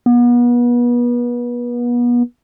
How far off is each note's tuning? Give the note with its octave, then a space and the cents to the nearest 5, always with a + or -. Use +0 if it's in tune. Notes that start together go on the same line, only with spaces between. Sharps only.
B3 -35